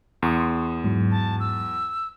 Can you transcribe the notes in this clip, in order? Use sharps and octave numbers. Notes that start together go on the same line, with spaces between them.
E2 C6 C#6 D#6
G#2 F#3
A5
E6